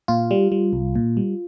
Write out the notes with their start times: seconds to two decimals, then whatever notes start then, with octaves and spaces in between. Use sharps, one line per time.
0.08 A#2 F4
0.31 G3
0.52 G3
0.73 C2
0.95 A#2
1.17 G3